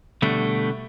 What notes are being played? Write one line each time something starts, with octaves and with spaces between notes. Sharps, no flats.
B2 D3 G3 A3